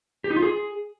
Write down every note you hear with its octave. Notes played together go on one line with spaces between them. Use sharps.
G4
D#4
F4
G#4